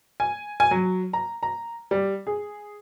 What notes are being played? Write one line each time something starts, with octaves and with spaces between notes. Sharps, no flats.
G#5
G#5
F#3
A#5
A#5
G3
G#4